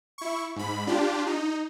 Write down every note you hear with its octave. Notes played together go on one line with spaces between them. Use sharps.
E4 C#6
G#2 B5
D4 F4 G4
D#4